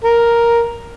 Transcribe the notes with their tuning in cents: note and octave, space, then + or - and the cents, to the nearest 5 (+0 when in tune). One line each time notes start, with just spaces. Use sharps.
A#4 +5